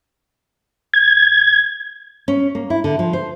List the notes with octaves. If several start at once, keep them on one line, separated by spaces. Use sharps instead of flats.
G#6
C#4
A#3
E4
D3
F3
C5